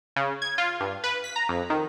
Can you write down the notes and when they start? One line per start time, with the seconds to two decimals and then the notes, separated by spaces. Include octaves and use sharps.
0.16 C#3
0.42 G#6
0.58 F4
0.80 G2
1.04 B4
1.24 B6
1.36 A#5
1.49 F2
1.70 D#3